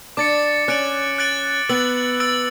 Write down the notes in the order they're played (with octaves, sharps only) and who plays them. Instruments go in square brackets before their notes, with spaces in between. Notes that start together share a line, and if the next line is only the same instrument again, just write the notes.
[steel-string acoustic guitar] D4 [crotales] D6 A6 C#7
[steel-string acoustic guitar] C#4 [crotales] F#6 A6 D7 F#7
[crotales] F#6 A6 D7 F#7
[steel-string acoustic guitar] B3 [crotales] E6 A6 D7 F#7
[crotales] E6 A6 D7 F#7